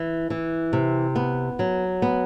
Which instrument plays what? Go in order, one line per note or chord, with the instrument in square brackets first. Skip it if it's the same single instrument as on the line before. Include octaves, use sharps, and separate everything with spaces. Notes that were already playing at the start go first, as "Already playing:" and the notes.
Already playing: [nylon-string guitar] E3
E3
C3
B3
F#3
B3